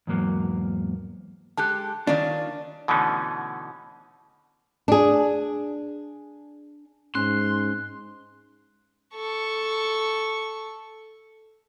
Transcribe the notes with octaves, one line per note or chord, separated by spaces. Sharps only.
E2 G#2 F#3 A#3
G#3 G4 A4 A5 F#6
D#3 C#4 D4 F4
B2 D3 E3 A3 C#4 D#4
D4 G#4
G#2 C#4 C6 F#6
A4 C#6